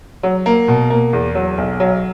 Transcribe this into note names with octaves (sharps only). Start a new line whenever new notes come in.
F#3
A#3
B2
A#3
E2
F#3
B1
F#3